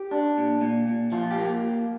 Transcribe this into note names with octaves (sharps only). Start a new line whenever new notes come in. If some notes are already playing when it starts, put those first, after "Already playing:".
Already playing: G4
D4
A#2
A#2
A#2
F3 F4
G4
A#3